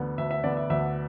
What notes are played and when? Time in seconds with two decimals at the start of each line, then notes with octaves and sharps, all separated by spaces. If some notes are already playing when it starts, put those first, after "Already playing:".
Already playing: D2 D3 B3
0.18 D2 E5
0.31 E5
0.43 D3 B3 D5
0.57 E5
0.70 D2 E5